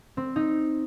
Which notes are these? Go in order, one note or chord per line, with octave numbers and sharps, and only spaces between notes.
C4
D#4